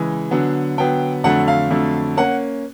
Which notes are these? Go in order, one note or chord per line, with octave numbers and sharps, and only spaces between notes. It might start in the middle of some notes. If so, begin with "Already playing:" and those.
Already playing: C#3 E3 G#3 G#5
D3 F#3 B3
D3 F#3 B3 G5
F2 D3 F#3 A3 F#5
F5
F2 D3 F#3 A3
A#3 C#4 F#5